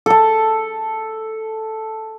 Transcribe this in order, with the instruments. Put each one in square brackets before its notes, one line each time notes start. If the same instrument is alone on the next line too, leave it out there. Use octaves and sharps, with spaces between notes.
[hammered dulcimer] A4 A5